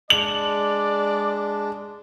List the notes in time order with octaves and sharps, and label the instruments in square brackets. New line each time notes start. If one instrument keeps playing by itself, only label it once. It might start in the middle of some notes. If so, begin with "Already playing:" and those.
[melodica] G#3 D4 [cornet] D5 [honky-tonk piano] F#7